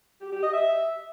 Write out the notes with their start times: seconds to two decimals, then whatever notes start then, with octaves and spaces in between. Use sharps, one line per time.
0.21 G4
0.32 G4
0.43 D#5
0.54 E5